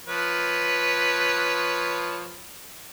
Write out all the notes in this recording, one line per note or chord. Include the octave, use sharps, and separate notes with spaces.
F3 B4 C#5